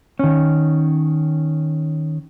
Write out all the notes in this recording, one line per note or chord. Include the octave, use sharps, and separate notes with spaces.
D#3 C#4